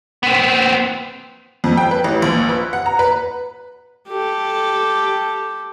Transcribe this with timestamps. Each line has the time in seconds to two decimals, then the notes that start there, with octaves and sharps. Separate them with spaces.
0.23 B3 C4
1.64 F2
1.77 G5
1.91 B4
2.04 A1
2.22 A#1
2.49 B4
2.73 F#5
2.86 A#5
2.99 B4
4.08 G4 A4